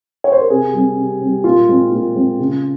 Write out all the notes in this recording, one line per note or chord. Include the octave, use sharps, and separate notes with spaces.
C#5
C5
A#4
C3 G#4
G3 C4
C3
G3 C4
A#2 F4
G#3 C4
A#2 F4
G#3 C4
C#3